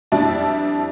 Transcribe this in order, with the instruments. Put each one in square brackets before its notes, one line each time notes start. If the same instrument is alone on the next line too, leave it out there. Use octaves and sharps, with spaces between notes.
[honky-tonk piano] F2 G3 D4 E4 A5